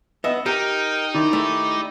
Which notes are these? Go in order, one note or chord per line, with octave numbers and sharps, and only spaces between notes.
B3 D#5 E5
D#4 G4 A#4 G5
D#3 E4 G4 D5
A3